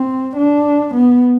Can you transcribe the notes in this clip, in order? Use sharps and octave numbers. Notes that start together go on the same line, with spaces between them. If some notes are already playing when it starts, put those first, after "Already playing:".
Already playing: C4
D4
B3